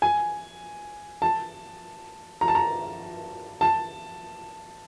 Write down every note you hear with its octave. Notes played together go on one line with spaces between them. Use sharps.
G#5
A5
A#5
A5
A#5
A5